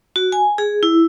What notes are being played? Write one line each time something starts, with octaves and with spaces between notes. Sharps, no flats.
F#4
G#5
G#4
E4